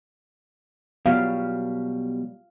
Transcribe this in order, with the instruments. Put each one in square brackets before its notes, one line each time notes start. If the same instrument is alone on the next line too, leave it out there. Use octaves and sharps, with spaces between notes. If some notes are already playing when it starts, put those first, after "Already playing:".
[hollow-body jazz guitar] B2 F#3 G3 [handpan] F5